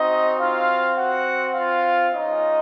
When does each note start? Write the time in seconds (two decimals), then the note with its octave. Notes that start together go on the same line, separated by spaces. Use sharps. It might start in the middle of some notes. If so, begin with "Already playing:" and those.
Already playing: C4 D#4 F#4 D#5
0.39 F4 F5
0.97 F#4 F#5
1.55 F4 F5
2.13 G#3 C#4 D#4 F4 D#5